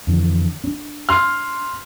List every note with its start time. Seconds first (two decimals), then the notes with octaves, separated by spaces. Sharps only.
0.07 F2 D3 E3
0.64 C#4 D4
1.09 C6 F6